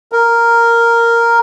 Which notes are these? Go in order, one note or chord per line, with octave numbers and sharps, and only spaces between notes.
A#4